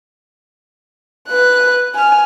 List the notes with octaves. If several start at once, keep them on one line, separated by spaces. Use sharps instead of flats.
B4 F#6
G#5 F6